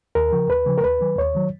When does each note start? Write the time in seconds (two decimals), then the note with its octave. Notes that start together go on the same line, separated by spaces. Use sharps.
0.15 D#2 A#4
0.33 C#3 F3
0.50 D#2 B4
0.66 C#3 F3
0.78 A#4
0.84 D#2 B4
1.01 D#3 F#3
1.18 D#2 C#5
1.35 D#3 F#3